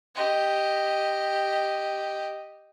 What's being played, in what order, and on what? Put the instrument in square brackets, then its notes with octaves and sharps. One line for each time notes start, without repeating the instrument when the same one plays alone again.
[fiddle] G4 D#5